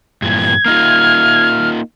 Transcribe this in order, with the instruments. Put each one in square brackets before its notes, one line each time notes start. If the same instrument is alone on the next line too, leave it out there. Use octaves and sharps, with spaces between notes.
[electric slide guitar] G2 A#2 E3 [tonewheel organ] G#6
[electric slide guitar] A#3 D#4 F4 [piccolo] F6